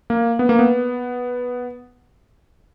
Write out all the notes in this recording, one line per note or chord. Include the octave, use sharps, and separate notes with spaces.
A#3
B3
A#3
B3